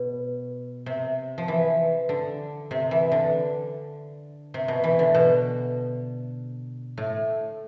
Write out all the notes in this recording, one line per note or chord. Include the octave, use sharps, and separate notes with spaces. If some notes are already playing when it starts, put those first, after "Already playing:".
Already playing: B2
C3
F3
E3
D3
C3
E3
D3
C3
B2
E3
D3
B2
A2